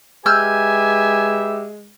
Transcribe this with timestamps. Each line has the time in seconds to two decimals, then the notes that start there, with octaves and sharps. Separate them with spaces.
0.26 G#3 G4 B4 E5 G#5 E6 F6 G6